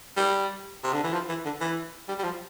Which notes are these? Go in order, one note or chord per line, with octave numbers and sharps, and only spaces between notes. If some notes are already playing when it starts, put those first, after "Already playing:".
G3
C3
D3
E3
F3
E3
D3
E3
G3
G3
F3